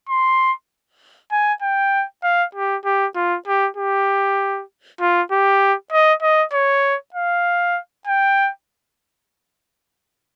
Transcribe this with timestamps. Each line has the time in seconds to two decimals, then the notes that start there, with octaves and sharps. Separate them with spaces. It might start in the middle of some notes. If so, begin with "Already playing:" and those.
0.09 C6
1.32 G#5
1.62 G5
2.24 F5
2.55 G4
2.85 G4
3.16 F4
3.47 G4
3.77 G4
5.01 F4
5.32 G4
5.92 D#5
6.22 D#5
6.53 C#5
7.14 F5
8.07 G5